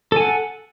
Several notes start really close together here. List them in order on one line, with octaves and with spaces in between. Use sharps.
A4 G#5 F#5